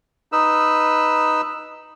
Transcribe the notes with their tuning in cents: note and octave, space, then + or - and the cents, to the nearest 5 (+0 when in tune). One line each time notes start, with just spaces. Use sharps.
D#4 +0 B4 +0 E6 +0